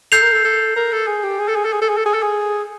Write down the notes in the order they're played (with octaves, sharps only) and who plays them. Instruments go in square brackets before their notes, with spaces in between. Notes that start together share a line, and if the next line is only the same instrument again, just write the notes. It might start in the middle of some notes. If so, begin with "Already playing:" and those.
[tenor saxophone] A4 [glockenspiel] G6 C7 F7
[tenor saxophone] A#4
A4
A4
A#4
A4
G#4
G4
G#4
A4
G#4
A4
G#4
A4
G#4
A4
G#4
A4
G#4